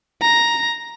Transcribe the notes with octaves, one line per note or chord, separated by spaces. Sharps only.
A#5